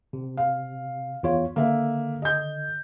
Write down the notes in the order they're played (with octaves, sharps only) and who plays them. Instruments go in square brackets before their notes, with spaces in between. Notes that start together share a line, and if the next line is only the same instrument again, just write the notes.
[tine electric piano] C3
[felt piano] F5
[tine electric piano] E2 F4 C#5
[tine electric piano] D3 [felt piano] A#3 E5
[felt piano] D#5 G6